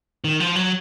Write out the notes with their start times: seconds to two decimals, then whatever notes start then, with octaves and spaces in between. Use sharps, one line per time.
0.24 D#3
0.40 F3
0.56 F#3